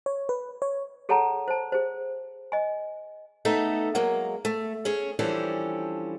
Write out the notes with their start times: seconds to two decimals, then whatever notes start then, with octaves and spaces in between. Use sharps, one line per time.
0.06 C#5
0.29 B4
0.62 C#5
1.09 G#4 A4 C#5 F#5 A5 A#5
1.48 C5 A5
1.72 G#4 C5
2.52 D#5 G#5
3.45 A3 B3 D#4 A4
3.95 F#3 G#3 A#3
4.45 A3
4.85 C#4 G#4 C#5
5.19 E3 F3 G3 C#4 D4 A4